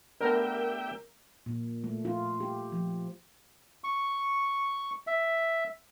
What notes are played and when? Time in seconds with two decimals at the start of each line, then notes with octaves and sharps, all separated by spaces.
0.21 A3 B3 D4 G4 A#4 E5 G5
1.46 A#2
1.84 A3
2.05 F4
2.40 G4
2.72 F3
3.84 C#6
5.07 E5